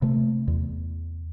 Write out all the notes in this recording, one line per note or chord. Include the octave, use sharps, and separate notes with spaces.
C3 A3
E2